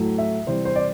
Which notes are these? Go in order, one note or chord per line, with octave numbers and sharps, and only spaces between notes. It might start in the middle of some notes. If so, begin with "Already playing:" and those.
Already playing: A2 F#3 A3
E5
C3 E3 G3 C5
C5
D5